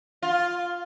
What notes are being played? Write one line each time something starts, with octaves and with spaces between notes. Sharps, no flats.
F4